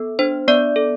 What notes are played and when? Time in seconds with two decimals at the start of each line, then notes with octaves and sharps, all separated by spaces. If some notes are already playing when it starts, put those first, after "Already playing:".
Already playing: B3 A4
0.19 D4 C5
0.48 B3 D5
0.76 A4